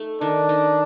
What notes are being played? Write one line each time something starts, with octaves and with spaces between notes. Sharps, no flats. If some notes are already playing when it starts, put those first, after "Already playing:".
Already playing: A3 D#4 A4
D#3 D4
D#4